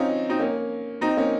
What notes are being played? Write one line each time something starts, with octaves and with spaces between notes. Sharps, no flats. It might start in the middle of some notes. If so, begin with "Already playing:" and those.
Already playing: C4 C#4 D#4 F4
C4 D#4
A#3 C#4
C4 D#4
A#3 C#4